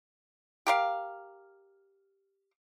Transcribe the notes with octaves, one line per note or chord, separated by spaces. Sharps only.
G4 A#4 F5